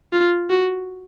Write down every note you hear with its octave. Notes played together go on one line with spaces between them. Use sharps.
F4
F#4